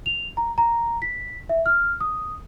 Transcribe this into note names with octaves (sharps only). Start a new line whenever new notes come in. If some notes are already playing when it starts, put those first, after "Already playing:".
F7
A#5
A#5
B6
E5
F6
D#6